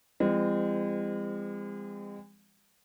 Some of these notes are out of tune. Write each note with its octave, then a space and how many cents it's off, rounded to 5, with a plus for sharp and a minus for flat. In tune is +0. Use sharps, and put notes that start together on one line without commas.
F3 -45 G#3 -40 C4 -25